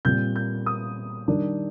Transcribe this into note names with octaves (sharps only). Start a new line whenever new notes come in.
A#2 G3 C4 G6
G6
D#6
D#3 G3 D4